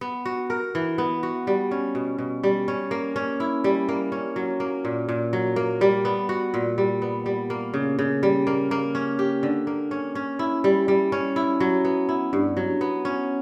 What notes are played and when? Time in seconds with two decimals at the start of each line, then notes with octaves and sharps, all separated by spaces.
0.01 B3
0.26 F#4
0.50 A#4
0.75 E3
0.98 B3
1.23 F#4
1.47 G3
1.71 C#4
1.95 B2
2.19 B2
2.44 G3
2.68 C#4
2.91 A#3
3.16 C#4
3.40 E4
3.64 G3
3.89 A#3
4.12 C#4
4.36 F#3
4.60 A#3
4.85 A#2
5.09 A#2
5.33 F#3
5.56 A#3
5.81 G3
6.05 B3
6.29 F#4
6.54 A#2
6.78 G3
7.02 B3
7.26 G3
7.50 A#3
7.74 C#3
7.99 C#3
8.23 G3
8.47 A#3
8.71 A#3
8.95 C#4
9.19 G4
9.43 D3
9.67 A#3
9.91 C#4
10.15 C#4
10.39 E4
10.64 G3
10.88 G3
11.12 C#4
11.36 E4
11.60 F#3
11.85 B3
12.09 E4
12.33 G2
12.57 F#3
12.81 B3
13.05 C#4